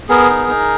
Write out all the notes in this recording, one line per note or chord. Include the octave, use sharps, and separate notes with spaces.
B3 G#4 A#4
D#4
D#4